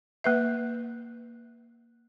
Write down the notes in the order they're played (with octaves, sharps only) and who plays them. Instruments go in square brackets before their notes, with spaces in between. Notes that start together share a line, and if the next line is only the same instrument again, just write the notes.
[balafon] A#3 B4 E5